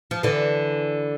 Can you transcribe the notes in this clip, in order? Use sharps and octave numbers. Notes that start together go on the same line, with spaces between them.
F3
D3 E3